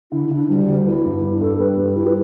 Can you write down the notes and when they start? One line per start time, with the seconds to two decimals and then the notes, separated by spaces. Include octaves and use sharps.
0.12 D3 E4
0.31 D3 D4
0.49 D2 G3
0.68 D2
0.86 B3 E4
1.04 G2
1.22 G2
1.41 G2 A4
1.59 G3 B4
1.77 G3
1.96 G3 E4
2.06 B4